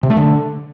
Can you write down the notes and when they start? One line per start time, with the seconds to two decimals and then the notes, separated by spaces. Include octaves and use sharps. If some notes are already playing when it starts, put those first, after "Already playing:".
0.03 C3
0.10 A3
0.17 D3